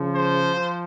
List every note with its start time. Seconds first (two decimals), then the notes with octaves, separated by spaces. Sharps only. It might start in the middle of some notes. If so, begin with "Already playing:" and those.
Already playing: C#3 F3
0.16 C5
0.55 F3